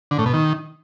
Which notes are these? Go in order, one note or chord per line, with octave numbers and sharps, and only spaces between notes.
D3
A2
B2
D#3